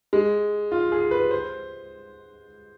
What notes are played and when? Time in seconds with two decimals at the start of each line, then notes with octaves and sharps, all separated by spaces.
0.13 G#3
0.72 F4
0.92 G#4
1.11 B4
1.31 C5